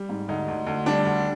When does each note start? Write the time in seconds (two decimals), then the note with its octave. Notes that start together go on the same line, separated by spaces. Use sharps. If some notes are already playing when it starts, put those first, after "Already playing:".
Already playing: G3
0.09 G#2
0.28 D2 D#4
0.48 D2
0.66 D2
0.86 G3 D4
1.05 D2